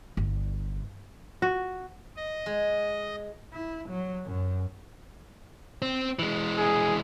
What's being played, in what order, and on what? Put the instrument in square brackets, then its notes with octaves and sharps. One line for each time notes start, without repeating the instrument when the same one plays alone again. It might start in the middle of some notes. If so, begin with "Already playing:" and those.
[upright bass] G1
[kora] F#4
[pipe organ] D#5
[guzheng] G#3
[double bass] E4
F#3
F#2
[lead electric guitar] C4
E3 G#3
[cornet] G#4